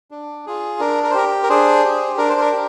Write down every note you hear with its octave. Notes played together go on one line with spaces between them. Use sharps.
D4
F4 G#4
D4 A#4
A#4
C5
G4 A#4
A#4
D4 G#4 C5
G4
D4 A#4
C5
A#4
G4